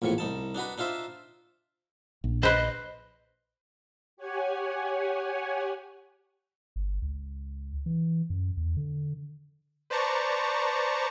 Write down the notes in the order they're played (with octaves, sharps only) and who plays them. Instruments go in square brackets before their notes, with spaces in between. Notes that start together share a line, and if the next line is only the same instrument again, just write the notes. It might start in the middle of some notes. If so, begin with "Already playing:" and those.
[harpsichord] A#1 E2 A2 F3 C#6
C2 D#4 A5
D4 D#4 F#4 B4
D4 D#4 F4 C5 E5
[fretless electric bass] A#1
[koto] B4 C5 [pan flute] D#5
[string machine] G4 C#5 F#5 G#5
[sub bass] G1
C#2
E3
F#2
E2
D3
[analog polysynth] B4 C5 D5 A5 A#5 C#6